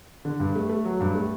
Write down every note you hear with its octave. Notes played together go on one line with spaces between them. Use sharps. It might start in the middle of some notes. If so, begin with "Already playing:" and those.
D3
G2
A3
A3
F#3
G2
A3